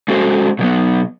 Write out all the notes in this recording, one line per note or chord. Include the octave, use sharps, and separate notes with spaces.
G#3 C#4 F#4 A4 C5
B2 F#3 B3